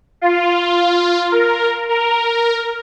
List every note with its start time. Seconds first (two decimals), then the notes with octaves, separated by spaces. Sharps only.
0.21 F4
1.32 A#4
1.89 A#4